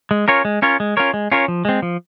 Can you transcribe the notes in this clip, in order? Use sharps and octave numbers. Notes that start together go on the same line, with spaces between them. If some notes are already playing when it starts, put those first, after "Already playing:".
G#3
C#4 F4 A#4 C#5
G#3
C#4 F4 A#4 C#5
G#3
C#4 F4 A#4 C#5
G#3
C#4 F4 A#4 C#5
F3
G#3 C4
F3